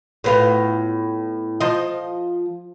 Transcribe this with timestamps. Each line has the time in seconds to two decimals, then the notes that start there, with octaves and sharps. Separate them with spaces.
0.24 A2 B3 F4
1.60 F3 D#5